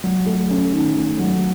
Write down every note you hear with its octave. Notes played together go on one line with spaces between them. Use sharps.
F#3
A3
C#4
D#3
A3
F#3